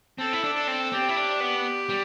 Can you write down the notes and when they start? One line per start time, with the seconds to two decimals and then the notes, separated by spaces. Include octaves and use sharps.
0.18 C4 A4
0.33 E4
0.44 D4
0.55 A4
0.67 C4
0.92 C4 G4
1.09 E4
1.17 D4
1.40 B3
1.89 G3